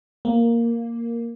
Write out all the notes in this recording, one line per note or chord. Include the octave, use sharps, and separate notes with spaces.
A#3